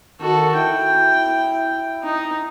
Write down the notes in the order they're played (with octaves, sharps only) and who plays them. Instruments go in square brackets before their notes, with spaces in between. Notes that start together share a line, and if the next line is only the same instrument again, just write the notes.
[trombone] D#3 [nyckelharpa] F#4 A4
[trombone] E4 [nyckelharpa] G5
[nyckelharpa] D#4